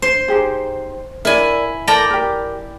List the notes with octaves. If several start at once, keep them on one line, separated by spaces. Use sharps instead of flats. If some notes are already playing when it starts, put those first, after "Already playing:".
C5
D#4 G4 G#4
E4 A#4 D5 G#5
A4 A#4 D5 G5 A5 A#5
G4 A#4